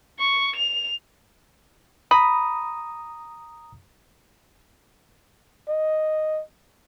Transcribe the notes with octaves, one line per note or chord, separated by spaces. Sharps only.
C#6
F7
A#5 B5 D#6
D#5